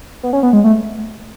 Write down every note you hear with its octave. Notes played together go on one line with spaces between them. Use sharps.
B3
C#4
B3
G#3
A3